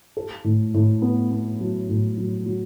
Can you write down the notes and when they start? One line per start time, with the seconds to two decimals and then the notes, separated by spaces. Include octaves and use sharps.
0.17 A4
0.44 A2
0.74 A2
1.02 B3
1.31 B3
1.60 F#3
1.89 A2
2.17 F#3
2.46 F#3